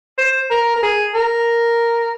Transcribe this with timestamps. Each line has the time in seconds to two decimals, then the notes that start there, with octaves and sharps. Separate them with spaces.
0.18 C5
0.50 A#4
0.76 A#4
0.83 G#4
1.14 A#4